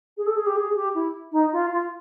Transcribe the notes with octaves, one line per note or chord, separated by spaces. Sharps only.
G#4
A4
G#4
G4
G#4
G4
E4
D#4
F4
F4